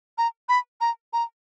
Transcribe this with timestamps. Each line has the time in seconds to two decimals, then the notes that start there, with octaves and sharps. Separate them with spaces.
0.18 A#5
0.49 B5
0.81 A#5
1.13 A#5